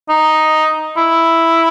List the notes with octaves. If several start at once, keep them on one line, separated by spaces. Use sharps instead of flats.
D#4
E4